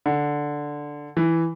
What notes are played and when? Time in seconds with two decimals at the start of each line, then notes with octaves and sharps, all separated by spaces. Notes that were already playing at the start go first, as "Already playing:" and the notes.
0.06 D3
1.17 E3